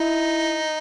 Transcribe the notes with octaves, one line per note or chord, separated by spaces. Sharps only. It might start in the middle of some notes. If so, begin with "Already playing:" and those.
Already playing: D#4 E4